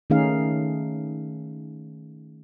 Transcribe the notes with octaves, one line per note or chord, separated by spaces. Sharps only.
D#3 A3 C#4 D#4 G#4 F5